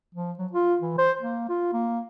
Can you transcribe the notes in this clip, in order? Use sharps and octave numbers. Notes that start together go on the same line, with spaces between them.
F3
F#3
F4
E3
C5
A#3
F4
A#3